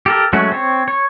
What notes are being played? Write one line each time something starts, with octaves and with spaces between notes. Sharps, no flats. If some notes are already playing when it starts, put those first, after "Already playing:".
G4 A4 A#4
F#3 G#3 A3 C#4 F#4
C4 C#5
C#5